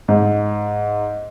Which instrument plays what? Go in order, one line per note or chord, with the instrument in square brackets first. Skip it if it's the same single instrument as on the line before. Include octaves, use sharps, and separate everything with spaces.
[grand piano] G#2